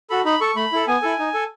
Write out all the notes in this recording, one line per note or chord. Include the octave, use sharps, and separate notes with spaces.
F#4 A4 B5
D#4 B5
A4 C#6
A3 B5
E4 A4
B3 G#5
E4 A4
D#4
A4